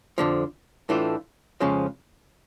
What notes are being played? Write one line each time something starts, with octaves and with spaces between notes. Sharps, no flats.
F2 D3 F3
A2 E3 A3 D4 F4
F2 C#3 F3 G#3 C#4